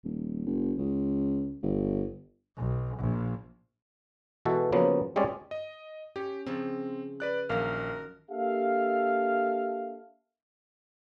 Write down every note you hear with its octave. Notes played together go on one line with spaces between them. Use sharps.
D#1
F#1
C#2
G1
B1
A#1
B2 E3 G#3 F#4 A4
C#3 F3 F#3 A#3 B3
G3 G#3 C4 C#4 G#4 D5
D#5
C#4 G4
C#3 F3 C4
B4 D5 F#6
A#1 F#2 D#3 A#4 F5
A#3 D4 G4 A4 E5 F5